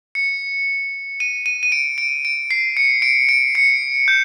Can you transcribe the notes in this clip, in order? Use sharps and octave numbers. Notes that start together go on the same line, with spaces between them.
C#7
D#7
D#7
D#7
D7
D7
D7
C7
C#7
D7
D7
C#7
G6